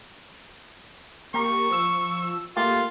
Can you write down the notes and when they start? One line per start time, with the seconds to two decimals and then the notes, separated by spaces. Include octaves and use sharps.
1.34 A#3 G4 A#4 C#6
1.70 F3 E6
2.57 A3 A#3 F4 G4